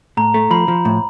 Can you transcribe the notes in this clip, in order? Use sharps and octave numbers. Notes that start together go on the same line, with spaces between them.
A2 A#5
A3
F3 B5
F3
A2